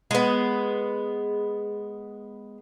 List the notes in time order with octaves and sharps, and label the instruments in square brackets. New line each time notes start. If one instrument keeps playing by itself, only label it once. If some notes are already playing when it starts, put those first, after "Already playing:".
[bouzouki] G#3 B3